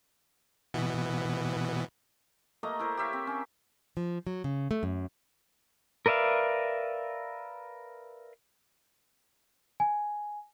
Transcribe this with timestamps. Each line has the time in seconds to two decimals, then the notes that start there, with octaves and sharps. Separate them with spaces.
0.74 B2 E3 B3
2.63 A3 A#3 D#5 A#5
2.79 E4 A#4 C5
2.97 G4 C#5 E5 F5
3.13 C4
3.27 C#4
3.97 F3
4.27 F#3
4.44 C#3
4.71 A3
4.83 F#2
6.06 A#4 B4 D5 E5 F5
9.80 G#5